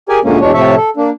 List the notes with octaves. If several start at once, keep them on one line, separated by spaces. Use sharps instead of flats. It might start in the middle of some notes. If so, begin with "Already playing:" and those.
G4 G#4 A#4 D5 G#5
D2 A#2 D3 G#3 A#3 C#4
E2 B2 G#3 D4 C#5
A2 C3 F3 C#5 E5 A5
A4
A#3 D4